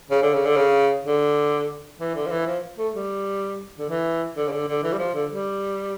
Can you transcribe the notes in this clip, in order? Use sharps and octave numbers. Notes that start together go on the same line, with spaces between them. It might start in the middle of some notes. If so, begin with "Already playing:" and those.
C#3
D3
C#3
D3
C#3
D3
E3
D3
F3
E3
F3
A3
G3
D3
E3
D3
C#3
D3
D3
E3
G3
F3
D3
G3